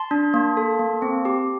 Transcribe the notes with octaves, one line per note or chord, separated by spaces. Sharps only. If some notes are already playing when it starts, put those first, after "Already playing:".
Already playing: A5 C6
D4
A#3
A4
A#3
C4
G4